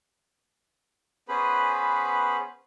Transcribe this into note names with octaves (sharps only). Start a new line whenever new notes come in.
B3 C#4 G#4 B4 C5 B5